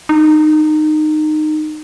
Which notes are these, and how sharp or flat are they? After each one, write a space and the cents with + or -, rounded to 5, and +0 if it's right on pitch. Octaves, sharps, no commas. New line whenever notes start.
D#4 -20